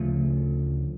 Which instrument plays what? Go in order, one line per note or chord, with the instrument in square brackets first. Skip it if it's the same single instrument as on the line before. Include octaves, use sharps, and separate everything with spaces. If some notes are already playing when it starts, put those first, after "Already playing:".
Already playing: [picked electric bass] D2 C#3 F3 A3